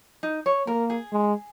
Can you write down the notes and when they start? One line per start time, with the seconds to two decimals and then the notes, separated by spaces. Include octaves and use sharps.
0.23 D#4
0.46 C#5
0.67 A#3 A#4
0.90 G#4
1.12 G#3